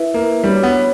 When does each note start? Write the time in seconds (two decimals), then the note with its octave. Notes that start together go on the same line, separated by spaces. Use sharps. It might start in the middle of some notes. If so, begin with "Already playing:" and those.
Already playing: E4 B4 E5
0.14 A#3
0.43 G3 D4 F#4 C#5
0.63 B3